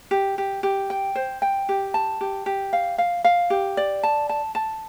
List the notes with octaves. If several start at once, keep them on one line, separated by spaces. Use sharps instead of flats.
G4
G4
G4
G5
C5
G5
G4
A5
G4
G4
F5
F5
F5
G4
D5
A5
A5
A5